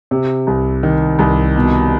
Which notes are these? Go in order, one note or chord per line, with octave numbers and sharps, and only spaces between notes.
C3
C2
D#3
C2
B2